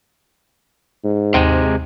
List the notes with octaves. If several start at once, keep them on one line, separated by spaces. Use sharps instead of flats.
G#2
D#2 C3 G#3